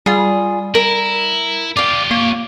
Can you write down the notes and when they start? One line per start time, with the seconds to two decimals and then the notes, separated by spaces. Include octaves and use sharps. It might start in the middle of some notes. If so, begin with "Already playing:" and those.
0.06 G3 F4 G#4
0.75 E4 A#4
1.77 F4 G4 D5 F5
2.11 A#3 C#5